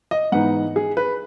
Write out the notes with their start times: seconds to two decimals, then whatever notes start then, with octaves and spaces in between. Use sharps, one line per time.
0.11 D#5
0.32 G#2 E3 B3 D#4 F#5
0.76 G#4
0.97 B4